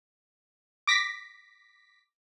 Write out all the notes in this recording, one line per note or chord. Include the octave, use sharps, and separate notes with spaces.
D6 A#6 B6